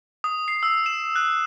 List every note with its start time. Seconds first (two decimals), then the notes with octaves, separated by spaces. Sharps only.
0.24 D#6
0.48 C7
0.63 E6
0.86 E7
1.16 F#6